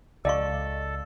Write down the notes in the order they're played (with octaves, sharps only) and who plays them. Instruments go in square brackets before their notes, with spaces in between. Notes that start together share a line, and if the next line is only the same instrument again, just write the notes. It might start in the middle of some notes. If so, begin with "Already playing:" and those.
[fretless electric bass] C#2 [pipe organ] A4 [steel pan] D5 [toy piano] D#5 F5 C#6